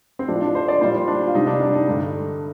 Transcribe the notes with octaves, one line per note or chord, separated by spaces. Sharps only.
C4
A2 F3 A3 D4
D4
C5
D5
A#2 G3 C5
D4
F4
C3 G3 D#4
D4
D4
D#4
G2 D3 A3